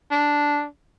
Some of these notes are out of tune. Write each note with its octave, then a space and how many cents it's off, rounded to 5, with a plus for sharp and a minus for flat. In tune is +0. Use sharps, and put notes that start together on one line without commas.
D4 -5